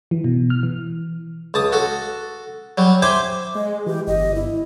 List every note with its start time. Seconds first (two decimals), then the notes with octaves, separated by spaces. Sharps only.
0.11 E3
0.24 B2
0.50 F6
0.63 E3
1.54 C#2 A5 D#6
1.72 F#4 A4
2.78 F#3 G3
3.02 C5 E5 G5 G#5 D6
3.55 G#3 D#5
3.86 E3 G4
4.07 G1 D#5
4.35 E4